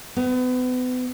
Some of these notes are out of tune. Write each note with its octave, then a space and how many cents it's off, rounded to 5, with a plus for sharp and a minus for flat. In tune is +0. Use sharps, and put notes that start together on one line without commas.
B3 +35